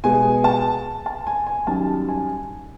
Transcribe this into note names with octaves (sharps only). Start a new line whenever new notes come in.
B2 G#3 G#5
A5
A5
G#5
G#5
F#2 D#3 G3 A5
G#5